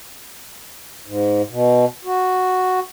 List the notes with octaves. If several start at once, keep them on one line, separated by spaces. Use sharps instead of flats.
G#2
B2
F#4